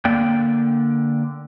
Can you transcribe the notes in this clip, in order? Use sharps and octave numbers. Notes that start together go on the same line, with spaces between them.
D3 A#3 D5 G5